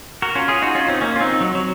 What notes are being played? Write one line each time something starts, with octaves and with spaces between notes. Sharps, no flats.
F#4 A#4
C#4 F4
F4 G#4
D#4 F#4
C#4 F4
C4 D#4
A#3 C#4
F4
C4 D#4
F#3
F#3